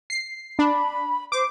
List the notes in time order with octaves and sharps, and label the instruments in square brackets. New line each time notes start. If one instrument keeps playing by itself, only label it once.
[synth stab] C7
[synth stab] D4 [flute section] B5
[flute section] C5 [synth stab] D6